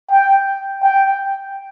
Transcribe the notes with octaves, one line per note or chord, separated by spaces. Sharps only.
G5
G5